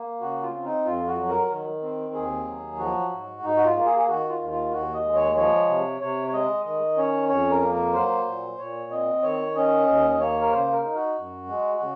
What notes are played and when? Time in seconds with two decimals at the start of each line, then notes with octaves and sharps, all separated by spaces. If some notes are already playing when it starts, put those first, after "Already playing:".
Already playing: A#3
0.21 C#3 F#4
0.43 F4
0.54 C4
0.64 D#4
0.85 F2 F4
1.07 F#4
1.18 F#3
1.29 A#4
1.50 D#3
1.82 C4
2.14 D#2 G#4
2.47 F#3
2.78 F3 F#4
3.11 G#2
3.43 G#2 D#4
3.56 F#4
3.64 F4
3.75 A#3
3.86 G#4
3.99 G#4
4.08 D#3 F#4
4.29 F4
4.39 D#2
4.50 F4
4.72 D#2 F#4
4.94 D#5
5.04 G#3
5.15 C#5
5.36 F3 C#5
5.68 C3
6.01 C3 C#5
6.28 C#5
6.33 G#3 D#5
6.65 D#3 D#5
6.97 C#4 C#5
7.29 F2 C#5
7.51 A#4
7.62 A#3
7.73 A#4
7.94 F#3 C5
8.27 A#2
8.58 A#2 C#5
8.91 C4 D#5
9.23 D#3 C#5
9.56 C#4 D#5
9.87 D#2 D#5
10.11 D#5
10.19 A#3 C#5
10.41 A#4
10.52 C#3 C5
10.73 A#4
10.84 D#4
10.95 F#4
11.17 F#2
11.49 G#3
11.80 C#3